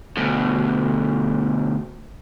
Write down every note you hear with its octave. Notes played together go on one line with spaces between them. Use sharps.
D2 B2